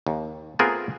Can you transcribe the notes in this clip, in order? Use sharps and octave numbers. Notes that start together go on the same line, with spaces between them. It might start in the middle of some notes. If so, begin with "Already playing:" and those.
D#2
A3 B3 C4 F4 G#4 A#4